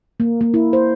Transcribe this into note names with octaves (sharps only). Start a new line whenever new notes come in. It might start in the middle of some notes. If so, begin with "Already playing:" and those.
A#3
A#3
E4
C5